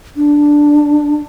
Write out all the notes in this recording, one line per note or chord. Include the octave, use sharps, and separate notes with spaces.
D4